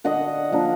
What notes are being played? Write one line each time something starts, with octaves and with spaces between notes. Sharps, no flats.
D3 D#5 F#5
F3 A#3 D4